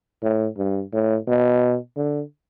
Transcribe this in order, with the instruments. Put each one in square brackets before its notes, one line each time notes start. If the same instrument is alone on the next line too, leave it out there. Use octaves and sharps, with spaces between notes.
[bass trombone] A2
G2
A2
B2
D3